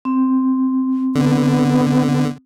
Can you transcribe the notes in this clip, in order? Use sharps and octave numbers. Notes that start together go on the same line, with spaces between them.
C4
D3 B3